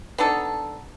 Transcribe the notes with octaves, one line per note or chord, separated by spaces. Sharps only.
B3 D4 D#4 A4